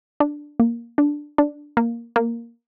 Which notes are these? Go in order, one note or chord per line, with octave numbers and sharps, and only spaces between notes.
D4
A#3
D4
D4
A#3
A#3